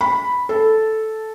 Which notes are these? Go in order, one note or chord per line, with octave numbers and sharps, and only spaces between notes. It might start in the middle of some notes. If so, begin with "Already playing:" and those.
B5
A4